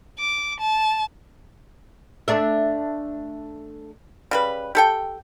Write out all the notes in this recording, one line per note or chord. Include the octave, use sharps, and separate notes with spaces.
D6
A5
A3 D4 E5
C#3 G3 B4
G4 A4 G5